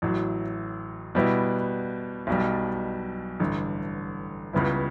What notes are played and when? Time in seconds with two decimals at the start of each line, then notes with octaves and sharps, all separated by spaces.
0.02 A1 A2 F#3
1.15 B2 G3 B3 E4
2.27 B1 B2 G3
3.40 A1 G2 D3
4.53 C#2 C#3 G3 B3 E4